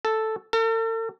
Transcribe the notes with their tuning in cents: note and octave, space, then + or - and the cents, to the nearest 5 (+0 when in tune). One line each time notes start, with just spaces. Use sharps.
A4 +0
A4 +45